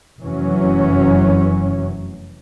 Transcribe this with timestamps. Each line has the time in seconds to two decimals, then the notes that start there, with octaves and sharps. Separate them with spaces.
0.20 F1 F#2 E3 F#3 C#4